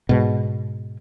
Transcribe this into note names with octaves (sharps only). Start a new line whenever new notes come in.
G#2 B2